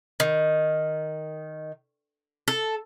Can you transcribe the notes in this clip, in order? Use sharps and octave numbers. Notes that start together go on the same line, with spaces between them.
D#3
A4